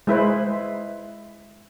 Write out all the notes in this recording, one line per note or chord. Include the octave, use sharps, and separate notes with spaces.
G#3 E4 B4 C5